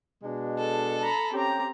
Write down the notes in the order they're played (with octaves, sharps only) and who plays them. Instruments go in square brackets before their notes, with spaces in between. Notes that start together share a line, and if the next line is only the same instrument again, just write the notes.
[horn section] B2 G#3 D4
[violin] A4
[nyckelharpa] A#5 B5
[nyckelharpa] C4 A#5 [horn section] C#4 G4